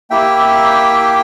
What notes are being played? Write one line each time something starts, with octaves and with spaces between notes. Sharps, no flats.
A#3 E4 G4 E5 G5